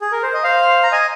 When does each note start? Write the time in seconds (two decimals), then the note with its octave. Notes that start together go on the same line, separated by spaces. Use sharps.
0.01 G#4
0.12 A#4
0.23 C5
0.33 D#5
0.44 C5 F5
0.83 A#5
0.92 D#5 G#5